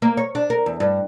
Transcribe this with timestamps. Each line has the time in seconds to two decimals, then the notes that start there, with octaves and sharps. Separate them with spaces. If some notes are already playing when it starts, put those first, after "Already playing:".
0.02 A#3
0.17 C#5
0.35 D4
0.50 A#4
0.66 E2
0.80 G2